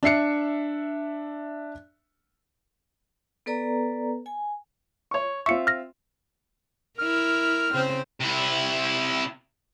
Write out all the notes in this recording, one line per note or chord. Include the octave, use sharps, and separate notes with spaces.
D4 E5 C7 C#7
B3 A4 B4 D5 A#5
G#5
C#5 C#6
C4 F4 E5 C#6 C#7
F6 A#6
E4 A#4 F6
C#3 C4 C5
C3 E4